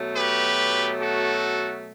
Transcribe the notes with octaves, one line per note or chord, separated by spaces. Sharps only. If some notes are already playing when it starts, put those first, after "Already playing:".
Already playing: B2 F#3 A3
G4 B4
F#4 A4